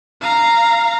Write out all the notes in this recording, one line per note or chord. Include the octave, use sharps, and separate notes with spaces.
F5 A#5